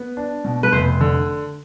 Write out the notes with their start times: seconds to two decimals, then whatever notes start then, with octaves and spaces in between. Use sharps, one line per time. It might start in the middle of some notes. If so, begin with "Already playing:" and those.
Already playing: B3
0.17 D4
0.44 B2
0.63 B4
0.72 F1 C5
1.00 D3